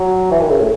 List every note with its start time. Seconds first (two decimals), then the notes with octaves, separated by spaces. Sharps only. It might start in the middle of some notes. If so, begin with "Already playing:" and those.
Already playing: F#3
0.31 E3
0.41 D#3
0.51 C#3
0.60 A2